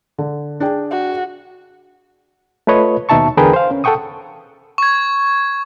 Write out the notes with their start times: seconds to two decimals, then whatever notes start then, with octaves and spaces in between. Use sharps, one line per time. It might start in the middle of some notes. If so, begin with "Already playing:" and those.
0.18 D3
0.60 D4 G#4 G5
0.91 F#4
2.67 A3 F4 B4 C#5 D#5
3.09 D#2 B2 D#4 E5 A5 C#6
3.37 E2 D3 G#4 A#4 B4 G5
3.53 C5 F5
3.71 C#4
3.84 A4 F#5 G5 C#6 D#6
4.78 C#6 G#6